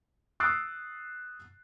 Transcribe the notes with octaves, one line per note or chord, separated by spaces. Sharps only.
D#6 E6 F#6 A6 C7 D7